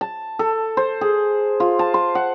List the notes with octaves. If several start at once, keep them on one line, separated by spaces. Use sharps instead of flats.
A5
A4
C5
G#4
F4
A5
C6
F#5